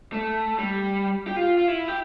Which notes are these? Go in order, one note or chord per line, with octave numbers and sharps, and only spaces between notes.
A3
G3
G4
F4
F4
E4
G4